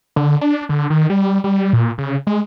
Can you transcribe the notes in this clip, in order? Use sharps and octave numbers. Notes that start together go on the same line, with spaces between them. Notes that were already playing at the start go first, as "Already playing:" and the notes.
D3
D4
D3
D#3
G3
G3
A#2
C#3
G#3